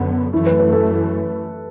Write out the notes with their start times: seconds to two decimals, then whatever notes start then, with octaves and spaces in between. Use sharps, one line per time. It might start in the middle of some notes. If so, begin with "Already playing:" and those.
Already playing: F#2 D3 B3
0.33 F#2 E3 A3 E4
0.47 B4
0.59 B4
0.73 A4